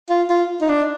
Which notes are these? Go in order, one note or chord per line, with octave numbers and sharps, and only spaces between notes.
F4
F4
D#4
D4